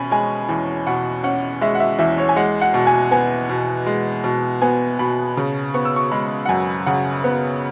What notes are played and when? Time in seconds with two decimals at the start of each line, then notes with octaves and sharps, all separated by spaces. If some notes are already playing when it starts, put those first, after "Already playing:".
Already playing: B2 C#4 G#5 B5
0.11 G#3 G#5
0.49 E2
0.87 B2 F#5
1.24 C#4 F#5
1.61 G#3 E5
1.75 F#5
1.80 E5
1.99 E2 E5
2.18 C#5
2.29 G#5
2.36 G#3 F#5
2.61 F#5
2.74 B2
2.87 G#5
3.11 B3 G#5
3.49 B2
3.87 G#3
4.24 B2
4.62 B3 G#5
4.99 B2 B5
5.37 C#3
5.74 B3 C#6
5.85 E6
5.96 C#6
6.12 G#3 B5
6.45 F#5
6.49 F#2 G#5
6.86 C#3 F#5
7.24 B3